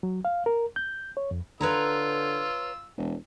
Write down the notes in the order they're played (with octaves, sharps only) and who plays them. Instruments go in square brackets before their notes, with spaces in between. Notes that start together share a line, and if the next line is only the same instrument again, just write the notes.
[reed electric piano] F#3
F5
A#4
G6
C#5
F2
[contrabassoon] D3 [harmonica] F4 E6 [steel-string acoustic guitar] B4 C#5 A#5
[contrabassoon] E1